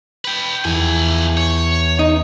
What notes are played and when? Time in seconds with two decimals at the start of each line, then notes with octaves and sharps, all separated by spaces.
0.25 B4 G5
0.65 E2 F3 G#5
1.37 C#5
1.99 D#4